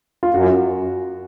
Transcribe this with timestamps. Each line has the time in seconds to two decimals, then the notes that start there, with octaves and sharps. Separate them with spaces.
0.23 F4
0.34 F#2 F#4